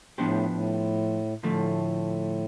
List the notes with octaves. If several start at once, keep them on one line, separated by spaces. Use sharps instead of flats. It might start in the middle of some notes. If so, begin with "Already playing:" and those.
A2 F3 B3 D4 G4 C5
A2
A2 D3 F3 A3